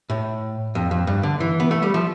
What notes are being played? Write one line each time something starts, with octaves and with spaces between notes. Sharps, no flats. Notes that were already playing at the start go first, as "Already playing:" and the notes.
A2
F2
F2
G2
D3
E3
B3
A3
G3
F3